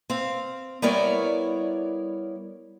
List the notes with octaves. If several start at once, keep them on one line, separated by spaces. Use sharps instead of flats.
C4 F5
G3 B3 E4 A#4 C#5 D5